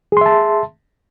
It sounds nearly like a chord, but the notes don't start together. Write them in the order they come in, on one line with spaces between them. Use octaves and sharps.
G#4 C6 E5 A5